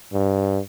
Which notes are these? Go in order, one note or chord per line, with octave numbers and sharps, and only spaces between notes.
G2